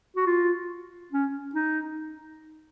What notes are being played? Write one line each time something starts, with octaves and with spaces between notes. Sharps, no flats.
F#4
F4
C#4
D#4